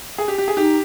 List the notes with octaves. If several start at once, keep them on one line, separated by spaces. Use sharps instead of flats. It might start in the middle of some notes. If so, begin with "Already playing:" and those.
G#4
G4
G4
G#4
D#4 G4